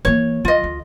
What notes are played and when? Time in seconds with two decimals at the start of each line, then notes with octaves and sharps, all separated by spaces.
0.05 E3 A#3 C#5
0.45 E3 F4 D#5
0.64 D2